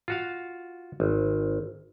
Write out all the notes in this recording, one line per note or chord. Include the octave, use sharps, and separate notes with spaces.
F4 F#4 F5
G#1